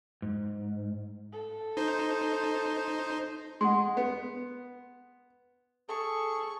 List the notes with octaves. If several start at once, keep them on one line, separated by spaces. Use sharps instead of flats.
G#2
A4
D#4 C5
G#3 F#5 C6
B3
G#4 A4 C#6